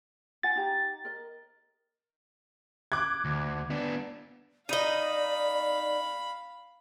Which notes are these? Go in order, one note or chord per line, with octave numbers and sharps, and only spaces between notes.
F4 F#5 G#5 A6
D#4 G4 A#5
A#4 D#5
D6 F#6 G#6
D2
B3 D4
D#4 D5 D#5 F5 B5